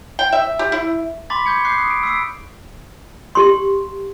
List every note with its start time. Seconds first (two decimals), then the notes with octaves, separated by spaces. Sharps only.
0.19 G5
0.32 E5
0.59 G4
0.72 E4
1.30 B5 C6 D6 A6 B6
1.46 C#6 G6 G#6 C#7
1.65 D6 F#6 G6 C7
1.78 D#6 C7
1.91 D7
2.03 E6 B6 C7 D7
3.35 G4 C6